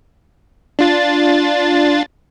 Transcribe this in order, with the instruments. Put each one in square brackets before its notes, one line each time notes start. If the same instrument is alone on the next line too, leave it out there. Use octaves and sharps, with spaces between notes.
[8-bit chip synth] D4 F4 A6